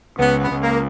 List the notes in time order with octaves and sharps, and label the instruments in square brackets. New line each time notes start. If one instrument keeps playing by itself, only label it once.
[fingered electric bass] C#2 [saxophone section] B3
[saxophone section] B3
[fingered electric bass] C#2
[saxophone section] A#3